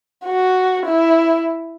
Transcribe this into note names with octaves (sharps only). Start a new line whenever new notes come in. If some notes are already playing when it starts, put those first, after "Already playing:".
F#4
E4